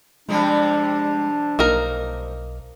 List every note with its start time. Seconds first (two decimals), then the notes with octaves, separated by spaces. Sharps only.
0.29 C3 F3 G3 G#3 D4
1.59 B1 A#3 D#4 A#4